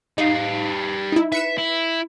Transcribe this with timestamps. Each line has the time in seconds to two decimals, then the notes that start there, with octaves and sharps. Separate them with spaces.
0.18 G3 D#4 F5
1.12 D#4 E4
1.32 B4 E5 C#7 E7
1.58 E4